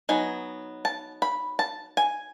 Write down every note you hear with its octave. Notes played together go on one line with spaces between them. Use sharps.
F#3 B3 D#4 G#5
A5
B5
A5
G#5